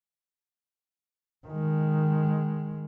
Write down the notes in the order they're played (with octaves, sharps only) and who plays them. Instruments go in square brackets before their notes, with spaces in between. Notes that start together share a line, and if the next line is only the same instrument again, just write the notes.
[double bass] D#3 G#3